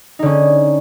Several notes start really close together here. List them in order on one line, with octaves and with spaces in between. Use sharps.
D#4 D3 C#4